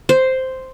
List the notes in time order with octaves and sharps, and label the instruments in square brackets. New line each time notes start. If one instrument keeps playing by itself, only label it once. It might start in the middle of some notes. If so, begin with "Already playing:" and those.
[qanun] C5